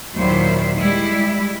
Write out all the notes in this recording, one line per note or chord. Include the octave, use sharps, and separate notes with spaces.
D#2 A#2 D#3 F#3 E4 C5
G3 G#3 E4